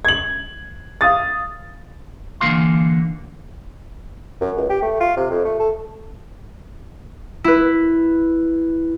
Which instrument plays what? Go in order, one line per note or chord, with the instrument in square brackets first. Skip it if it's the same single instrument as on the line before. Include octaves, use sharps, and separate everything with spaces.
[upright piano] G#6 F#7
F5 D#6 A6
[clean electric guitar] D3 E3 A#3 F4 F5 C6
[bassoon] F#2
C#2
G4
A3
F4
C3
F2
A3
A4
[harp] E4 B4